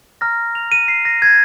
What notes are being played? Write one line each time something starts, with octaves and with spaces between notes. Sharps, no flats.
A#5 F6 A#6
F7
D#7
C7
A#6
G#6